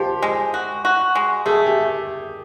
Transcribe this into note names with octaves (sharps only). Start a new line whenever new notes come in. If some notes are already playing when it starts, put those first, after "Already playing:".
Already playing: F3 G4
G#3
F#4
F#4
G#3
A3 G#4
G4